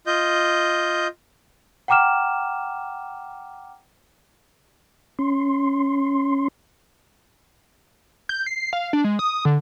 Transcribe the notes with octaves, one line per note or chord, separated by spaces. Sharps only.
F4 D#5 G6
F#5 G5 A#5 D6 F6 E7
C#4 C6
G6
C7
F5
D4
G#3
D#6
D3